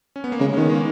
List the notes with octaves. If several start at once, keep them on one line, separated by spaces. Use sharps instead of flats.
C#4
B3
A#3
C#3 G#3
C#4
D#3 B3
G#3
A#3